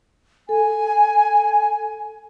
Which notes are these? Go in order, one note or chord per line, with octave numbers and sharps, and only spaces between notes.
A4 G#5